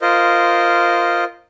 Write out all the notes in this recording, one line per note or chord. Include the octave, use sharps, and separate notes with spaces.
F4 A#4 C5 D#5